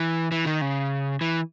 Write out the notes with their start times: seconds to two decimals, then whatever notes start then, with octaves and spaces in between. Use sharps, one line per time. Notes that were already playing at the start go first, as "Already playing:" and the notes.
Already playing: E3
0.32 E3
0.46 D#3
0.61 C#3
1.21 E3